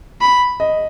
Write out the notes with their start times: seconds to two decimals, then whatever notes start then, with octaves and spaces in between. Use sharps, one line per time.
0.21 B5
0.60 D#5